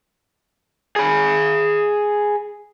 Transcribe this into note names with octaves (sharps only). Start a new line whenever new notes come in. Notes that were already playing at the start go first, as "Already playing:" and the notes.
G#4 B5